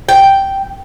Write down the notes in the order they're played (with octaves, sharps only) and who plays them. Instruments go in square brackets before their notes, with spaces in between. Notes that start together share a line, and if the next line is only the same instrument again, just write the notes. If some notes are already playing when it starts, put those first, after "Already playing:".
[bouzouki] G5